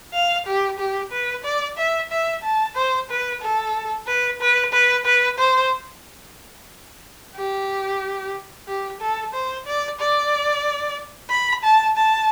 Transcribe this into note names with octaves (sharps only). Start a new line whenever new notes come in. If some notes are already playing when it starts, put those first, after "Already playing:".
F5
G4
G4
B4
D5
E5
E5
A5
C5
B4
A4
B4
B4
B4
B4
C5
G4
G4
A4
C5
D5
D5
B5
A5
A5